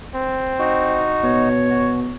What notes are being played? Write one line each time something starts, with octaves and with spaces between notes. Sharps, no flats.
C4
D#4 F#4
B2 C#5
F#4